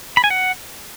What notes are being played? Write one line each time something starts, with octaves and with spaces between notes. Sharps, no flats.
B5
G#5
F#5